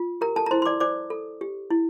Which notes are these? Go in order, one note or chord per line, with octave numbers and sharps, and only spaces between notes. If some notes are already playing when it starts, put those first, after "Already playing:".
Already playing: F4
G4 A#4 A#5
A4 A5
A#5
E4 C5 C6
C6
D5 D6
C5 D5 D6
A4
G4
E4